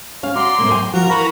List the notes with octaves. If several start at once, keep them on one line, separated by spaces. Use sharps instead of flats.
C#4 F5
F#4 D5 A#5 C6
A2 C3 A#3
F#2 G5 G#5
F3 F4 F#4 A#4
E3 F#4 A#4 B4 A#5